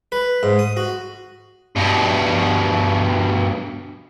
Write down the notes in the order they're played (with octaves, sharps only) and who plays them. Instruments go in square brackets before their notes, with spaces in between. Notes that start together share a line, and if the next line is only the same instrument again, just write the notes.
[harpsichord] B4
G#2
D#6
F#4
[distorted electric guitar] G2 B2